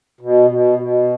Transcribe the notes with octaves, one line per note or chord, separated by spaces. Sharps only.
B2
B2
B2